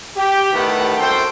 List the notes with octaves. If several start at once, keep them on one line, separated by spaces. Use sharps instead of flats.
G4
A2 D#3 B3 G4 A4 F#5
C2 F#2 A4 C5 G5